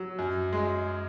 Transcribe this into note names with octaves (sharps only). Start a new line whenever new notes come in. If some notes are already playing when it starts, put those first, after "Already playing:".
Already playing: F#3
F#2
G#3